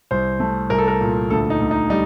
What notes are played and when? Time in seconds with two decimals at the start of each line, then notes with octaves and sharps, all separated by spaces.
0.11 C2 C5
0.40 A3
0.70 C2 A#4
0.78 A4
0.88 A#4
1.01 A#2
1.30 D2 A4
1.50 D#4
1.61 D2
1.71 D#4
1.90 G3 D#4